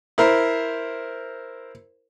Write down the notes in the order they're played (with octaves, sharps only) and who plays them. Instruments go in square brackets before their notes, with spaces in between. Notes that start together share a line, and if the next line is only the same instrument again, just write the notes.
[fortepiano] E4 A#4 C5